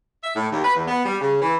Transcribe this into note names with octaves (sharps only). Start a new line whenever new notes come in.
E5
A2
D#2
B4
E2
B3
G3
C#3
E3